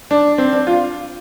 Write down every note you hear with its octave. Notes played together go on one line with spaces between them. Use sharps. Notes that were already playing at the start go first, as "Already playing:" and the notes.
D4
C4
D4
F4